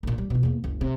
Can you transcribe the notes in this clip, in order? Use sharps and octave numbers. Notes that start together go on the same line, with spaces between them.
A#1 A#2
G3
B2 F4
E2 A#3
F#1 C#2
C3